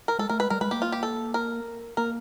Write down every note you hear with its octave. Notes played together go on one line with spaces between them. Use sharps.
A#4
G#3 A4
A3 A#4
G#3 B4
G3 A#4
G#3 B4
A#3 G4
F4
G4
A4
A#4
A#3 A#4